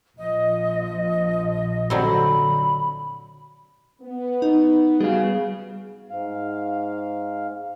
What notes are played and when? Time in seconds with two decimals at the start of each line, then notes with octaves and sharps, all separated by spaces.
0.18 A#1 F3 D#5
1.90 D3 F#3 C4 B5
4.02 B3
4.42 D#4
5.00 G3 B3 F#4 G#4 F5
6.10 G#2 F5